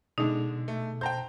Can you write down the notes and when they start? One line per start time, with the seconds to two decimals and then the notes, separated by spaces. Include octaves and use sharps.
0.18 B2 D3 G#3 D4 D#4
0.68 A3
1.01 C5 G5 A5 A#5 G6